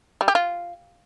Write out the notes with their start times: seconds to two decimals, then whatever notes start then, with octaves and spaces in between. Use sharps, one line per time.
0.21 G3
0.28 G4
0.35 F4